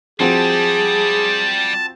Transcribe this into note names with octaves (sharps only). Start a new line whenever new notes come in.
F3 G3 C4 F#4 G#4 A5